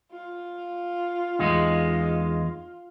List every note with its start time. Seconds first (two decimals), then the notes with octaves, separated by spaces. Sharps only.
0.12 F4
1.39 E2 G#3 D#4